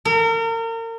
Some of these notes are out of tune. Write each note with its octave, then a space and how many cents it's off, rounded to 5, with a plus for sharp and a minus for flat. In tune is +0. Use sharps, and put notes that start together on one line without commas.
A#4 -35